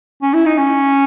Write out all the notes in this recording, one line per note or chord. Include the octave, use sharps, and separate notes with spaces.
C#4
E4
D#4
C#4